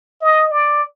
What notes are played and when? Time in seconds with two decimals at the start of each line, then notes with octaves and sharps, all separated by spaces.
0.21 D#5
0.51 D5